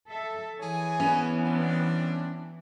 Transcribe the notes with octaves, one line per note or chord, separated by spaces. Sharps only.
A4 E5
E3 G#4 C#5 G#5
B3 C#4
G3 C4 D4